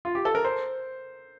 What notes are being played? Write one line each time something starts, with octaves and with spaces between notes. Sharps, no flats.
F4
G4
A4
A#4
C5